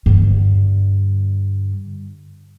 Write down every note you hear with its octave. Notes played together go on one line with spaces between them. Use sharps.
G2 D3